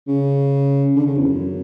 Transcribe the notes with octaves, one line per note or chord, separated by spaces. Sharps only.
C#3
D3
C#3
E2
F#2